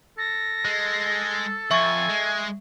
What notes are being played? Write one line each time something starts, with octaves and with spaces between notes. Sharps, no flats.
A4 A#6
G#3
F2 E5 G#5 C#6
G#3